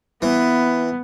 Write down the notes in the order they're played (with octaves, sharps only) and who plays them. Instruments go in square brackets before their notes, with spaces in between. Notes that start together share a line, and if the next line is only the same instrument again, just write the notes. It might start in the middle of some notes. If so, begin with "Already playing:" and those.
[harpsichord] E3 [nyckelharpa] B3